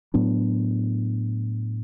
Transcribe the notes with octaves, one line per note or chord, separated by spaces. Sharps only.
A2 F#3 B3 D4